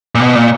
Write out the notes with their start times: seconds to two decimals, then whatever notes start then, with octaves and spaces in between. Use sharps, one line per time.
0.15 A#2
0.20 B2
0.35 A#2